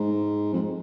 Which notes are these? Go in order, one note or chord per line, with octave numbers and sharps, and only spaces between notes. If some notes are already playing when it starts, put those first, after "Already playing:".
Already playing: G#2
F2